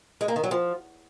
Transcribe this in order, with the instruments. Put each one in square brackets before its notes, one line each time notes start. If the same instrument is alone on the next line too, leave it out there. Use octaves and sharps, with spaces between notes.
[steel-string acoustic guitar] G#3
A#3
D#3
F#3
F3